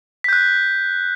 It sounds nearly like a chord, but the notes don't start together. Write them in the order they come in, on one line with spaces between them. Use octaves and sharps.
B6 G6 F#6